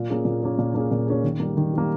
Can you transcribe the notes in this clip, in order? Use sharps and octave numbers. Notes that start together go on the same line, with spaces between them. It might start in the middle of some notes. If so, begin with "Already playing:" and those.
Already playing: A#2
A#3 C#4 G#4
A#2
A#3 C#4 G#4
A#2
A#3 C#4 G#4
A#2
A#3 C#4 G#4
D#3
G3 A#3
D#3
G3 A#3